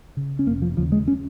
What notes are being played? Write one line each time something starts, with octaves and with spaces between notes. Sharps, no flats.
C#3
C#4
F1 A#3
F3
D#2 C#3 F3
G#3
C#4